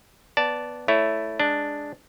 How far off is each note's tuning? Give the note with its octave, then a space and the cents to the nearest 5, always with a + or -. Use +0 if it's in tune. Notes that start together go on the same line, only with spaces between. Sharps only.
B3 +0 D5 -10 A5 +0
A3 +0 E4 +0 C#5 +20
G#3 +0 D4 +0